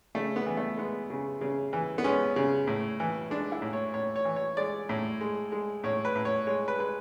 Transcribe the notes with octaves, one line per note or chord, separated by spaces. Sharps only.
C#3 A3
B3
E3
A3
G#3 B3
C#3
C#3
E3
B3
G#3 C#4
C#3
A2
E3
G#3 D4
E4
A2
C#5
A2 C#5
C#5
E3
C#5
G#3 D5
A2
G#3
G#3
A2 C#5
B4
A2
C#5
G#3 C#5
B4
G#3 B4